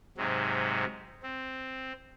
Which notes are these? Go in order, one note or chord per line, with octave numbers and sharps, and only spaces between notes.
G#2 C3 F#3
C4